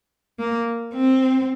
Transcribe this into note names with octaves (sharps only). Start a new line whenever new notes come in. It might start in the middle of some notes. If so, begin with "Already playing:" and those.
A#3
C4